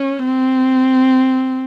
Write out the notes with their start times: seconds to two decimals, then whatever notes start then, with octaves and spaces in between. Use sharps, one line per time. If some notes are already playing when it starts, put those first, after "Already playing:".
Already playing: C#4
0.25 C4